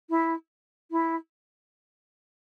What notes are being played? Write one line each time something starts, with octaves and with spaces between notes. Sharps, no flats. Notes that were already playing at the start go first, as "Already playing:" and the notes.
E4
E4